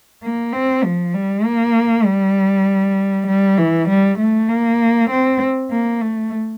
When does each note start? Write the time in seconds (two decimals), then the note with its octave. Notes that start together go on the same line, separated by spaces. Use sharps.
0.23 A#3
0.53 C4
0.84 F3
1.14 G3
1.45 A#3
2.05 G3
3.27 G3
3.58 E3
3.89 G3
4.19 A3
4.49 A#3
5.10 C4
5.71 A#3
6.01 A3